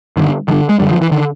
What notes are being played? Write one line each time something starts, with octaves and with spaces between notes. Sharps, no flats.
G2 D3 D#3
G2 D3 D#3
G#3
F#2 D3 G3
F3
E3
D3 D#3